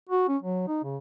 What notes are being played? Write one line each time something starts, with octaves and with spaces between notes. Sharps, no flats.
F#4
C#4
F#3
D#4
C#3